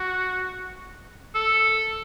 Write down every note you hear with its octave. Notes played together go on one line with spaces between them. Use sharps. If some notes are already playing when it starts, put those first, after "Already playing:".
Already playing: F#4
A4